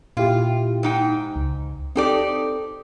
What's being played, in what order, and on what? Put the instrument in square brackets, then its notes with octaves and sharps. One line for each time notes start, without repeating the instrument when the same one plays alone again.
[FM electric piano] A#2 E4 G4 [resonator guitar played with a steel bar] F4
[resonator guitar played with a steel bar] G#2 D#4 G5
[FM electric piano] C#2
[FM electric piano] C4 A4 [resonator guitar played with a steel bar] D#4 G4 D5